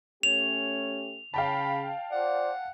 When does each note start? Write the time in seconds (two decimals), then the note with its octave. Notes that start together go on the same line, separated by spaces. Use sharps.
0.23 A3 C#4 G4 C#5 F7
1.34 C#3 F5 G5 A5 B5
2.12 F4 C5 D5 F#5